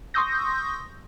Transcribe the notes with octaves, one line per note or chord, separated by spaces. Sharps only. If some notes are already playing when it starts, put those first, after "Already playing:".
C6 C#6 D#6 E6 G6 A#6